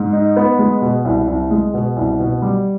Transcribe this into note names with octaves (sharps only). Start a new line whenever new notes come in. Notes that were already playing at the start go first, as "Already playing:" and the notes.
Already playing: G#2
D#4
B3
G#3
B2
C2
C2
G#3
B2
C2
B2
G3